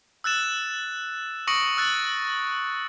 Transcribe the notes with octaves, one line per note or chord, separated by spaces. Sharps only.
E6 F#6 A6 E7
C#6 D#6 A#6 C#7 D7 F#7
E6 F#6 A6